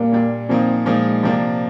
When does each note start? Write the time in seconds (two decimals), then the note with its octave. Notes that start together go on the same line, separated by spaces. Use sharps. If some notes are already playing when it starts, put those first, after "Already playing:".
Already playing: A#2 G3 A#3 D4
0.12 A#2 G3 D4
0.49 A#2 F3 A#3 C4 D#4
0.85 A#2 F3 G#3 A#3 D#4
1.23 C3 F3 A#3 D4